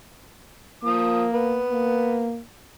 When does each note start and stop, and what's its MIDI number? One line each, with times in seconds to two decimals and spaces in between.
0.84 1.25 53
0.84 1.62 58
0.84 1.25 87
1.32 2.30 59
1.72 2.40 58